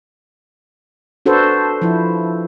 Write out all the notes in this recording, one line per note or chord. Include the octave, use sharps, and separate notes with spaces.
D4 F#4 A4 B4 C5
F3 E4